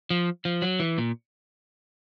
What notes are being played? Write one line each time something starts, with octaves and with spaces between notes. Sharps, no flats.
F3
F3
F#3
E3
A#2